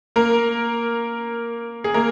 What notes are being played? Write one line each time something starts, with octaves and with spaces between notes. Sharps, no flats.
A#3 A#4
G#4
A#3 A#4